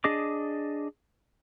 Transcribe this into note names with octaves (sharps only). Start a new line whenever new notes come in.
D4 G#4 D#5 D6